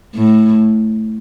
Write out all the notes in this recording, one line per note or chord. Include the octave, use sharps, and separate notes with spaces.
A2